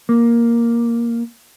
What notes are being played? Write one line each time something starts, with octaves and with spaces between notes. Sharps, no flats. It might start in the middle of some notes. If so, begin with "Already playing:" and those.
A#3